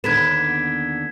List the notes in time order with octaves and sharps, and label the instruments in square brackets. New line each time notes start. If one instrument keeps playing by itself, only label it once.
[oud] D#2 D3 B3 [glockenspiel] G#6 B6 E7